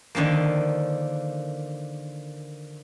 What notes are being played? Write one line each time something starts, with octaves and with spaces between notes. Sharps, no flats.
D3 D#3 F3 A#3